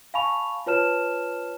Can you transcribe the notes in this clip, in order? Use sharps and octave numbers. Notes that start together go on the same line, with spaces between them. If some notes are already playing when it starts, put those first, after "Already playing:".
F5 G#5 A5 B5 C#6 F7
F4 B4 C#5 A5 F6 E7